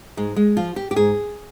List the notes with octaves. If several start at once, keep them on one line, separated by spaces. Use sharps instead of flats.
G#2 G#3
G#3
F3 F4
G4
G4
G#2 G#4